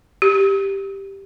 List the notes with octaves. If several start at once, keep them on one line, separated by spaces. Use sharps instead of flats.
G4